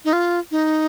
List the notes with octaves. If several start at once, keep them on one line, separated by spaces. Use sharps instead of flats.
D#4
F4
D#4